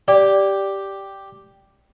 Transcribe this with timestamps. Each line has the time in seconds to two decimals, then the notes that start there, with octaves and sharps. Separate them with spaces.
0.08 G4 D5